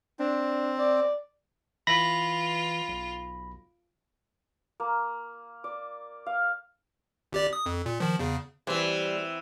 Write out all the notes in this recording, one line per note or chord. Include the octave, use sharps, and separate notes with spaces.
C4 D4
D5
E3 F4 B5 A#6
B1
A#3
D5
F5
G#1 G4 D5
D#6
F2
A#2
D#3 F3
E2 C#3
E3 G3 C4 G4